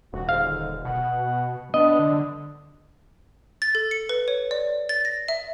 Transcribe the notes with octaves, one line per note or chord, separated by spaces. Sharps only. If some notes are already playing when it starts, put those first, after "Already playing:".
D#1 F#4
G#2 D3 F5
B2 F#5
B3 D4 D#5
D3
A6
A4
C#7
B4
C#5
D5
A6
A#6
E5